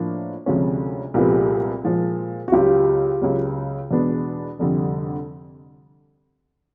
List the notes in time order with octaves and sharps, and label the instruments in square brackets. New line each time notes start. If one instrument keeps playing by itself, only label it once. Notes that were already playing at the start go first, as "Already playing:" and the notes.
Already playing: [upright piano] A2 F3 A#3 D4
D2 C3 F3 G#3 C#4
[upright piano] C2 A#2 F3 G#3 B3 [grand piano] G4 A4
[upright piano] A#2 F3 G#3
[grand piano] F#4
[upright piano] C#2 C#3 F#3 [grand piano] F4 G4
[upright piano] C#2 C#3 F#3
E2 B2 G#3 B3 D4
F1 F2 D3 G3